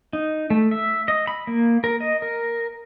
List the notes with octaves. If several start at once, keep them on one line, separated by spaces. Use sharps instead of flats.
D#4
A3
E5
D#5
B5
A#3
A#4
D#5
A#4